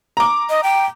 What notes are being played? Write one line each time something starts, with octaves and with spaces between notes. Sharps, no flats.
A#5 D6
D#5
G5